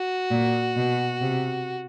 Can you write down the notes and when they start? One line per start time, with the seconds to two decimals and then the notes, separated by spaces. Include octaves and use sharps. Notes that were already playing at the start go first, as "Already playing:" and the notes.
Already playing: F#4
0.31 A#2
0.76 B2
1.21 C3